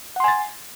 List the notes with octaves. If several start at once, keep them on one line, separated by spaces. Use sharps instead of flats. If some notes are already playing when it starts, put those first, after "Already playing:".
F#5 G#5 C6 A6